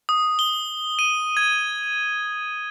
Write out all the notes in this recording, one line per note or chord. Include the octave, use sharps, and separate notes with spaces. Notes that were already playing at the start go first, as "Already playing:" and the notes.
D#6
G7
D#7
G#6